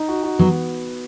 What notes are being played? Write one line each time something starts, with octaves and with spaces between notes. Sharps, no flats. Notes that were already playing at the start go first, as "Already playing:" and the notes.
Already playing: D#4
F#4
F#4
F#3 B3